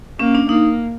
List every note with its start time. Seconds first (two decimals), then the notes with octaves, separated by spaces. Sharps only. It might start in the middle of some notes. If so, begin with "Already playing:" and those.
0.19 A#3 C#4
0.35 D4
0.49 A#3 D#4